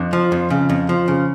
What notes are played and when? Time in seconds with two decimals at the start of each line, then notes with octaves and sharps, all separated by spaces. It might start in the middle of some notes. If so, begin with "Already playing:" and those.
Already playing: F2 D4
0.13 F3
0.32 F2
0.50 C#3
0.69 F2
0.89 F3
1.08 C#3